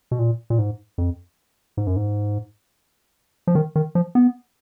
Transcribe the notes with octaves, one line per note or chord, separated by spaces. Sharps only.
B2
A#2
A#2
G#2
F2
G#2
F#2
G#2
F3
D#3
D#3
F3
B3